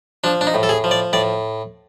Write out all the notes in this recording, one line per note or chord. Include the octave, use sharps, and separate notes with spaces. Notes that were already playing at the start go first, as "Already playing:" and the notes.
F3 D4
D4
D#4
A2
A4
G#4
F3
D5
A2 D5